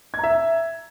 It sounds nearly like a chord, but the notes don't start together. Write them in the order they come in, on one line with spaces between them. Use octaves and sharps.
G#6 A#5 E5